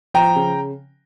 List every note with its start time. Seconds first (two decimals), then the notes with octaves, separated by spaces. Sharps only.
0.14 F3 G5 A#5
0.36 C#3